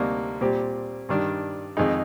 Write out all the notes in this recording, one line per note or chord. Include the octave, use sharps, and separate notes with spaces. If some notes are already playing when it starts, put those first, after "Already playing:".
Already playing: D2 C3 G3 A#3 D#4
A#2 G3 C4 G4
G2 D#3 G3 D4
F2 D#3 G#3 D#4 G#4